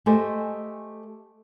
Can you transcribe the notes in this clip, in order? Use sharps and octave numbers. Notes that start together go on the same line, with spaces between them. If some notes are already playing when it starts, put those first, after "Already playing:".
A3 G4 A4 C5 D#5 G#5